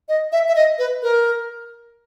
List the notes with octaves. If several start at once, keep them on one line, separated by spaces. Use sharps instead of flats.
D#5
E5
E5
D#5
B4
A#4